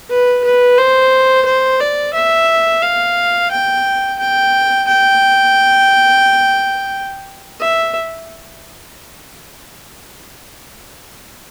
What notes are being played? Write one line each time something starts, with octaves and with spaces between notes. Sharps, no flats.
B4
B4
C5
C5
D5
E5
F5
G5
G5
G5
E5